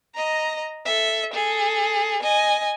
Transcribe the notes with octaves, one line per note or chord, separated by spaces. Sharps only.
D#5 A#5
A4 E5
G#4 A4
D#5 G#5